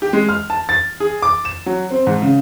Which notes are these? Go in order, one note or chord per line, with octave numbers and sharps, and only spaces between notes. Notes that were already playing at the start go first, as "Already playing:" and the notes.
G4
G#3
F6
A5
A6
G#4
D6
E7
F#3
C4
G#2
C#3